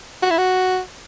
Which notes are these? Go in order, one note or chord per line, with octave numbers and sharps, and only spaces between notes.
F#4
E4
F#4